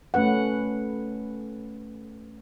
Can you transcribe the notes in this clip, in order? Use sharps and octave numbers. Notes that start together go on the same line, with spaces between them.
A3 C#4 B4 F#5